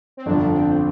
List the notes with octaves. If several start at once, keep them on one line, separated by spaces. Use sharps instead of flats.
C4
G1 F2 D3 F3 D4
C4